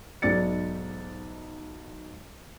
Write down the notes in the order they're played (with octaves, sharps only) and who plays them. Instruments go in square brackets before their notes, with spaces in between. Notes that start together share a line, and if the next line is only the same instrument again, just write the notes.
[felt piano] B1 G#2 D5 A6 C#7